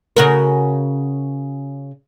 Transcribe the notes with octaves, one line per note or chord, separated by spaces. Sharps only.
C#3 F#4 A#4